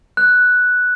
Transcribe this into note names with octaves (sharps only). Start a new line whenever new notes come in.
F#6